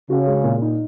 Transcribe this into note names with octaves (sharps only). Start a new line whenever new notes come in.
C#3 F#4
G#3
A#2
D#4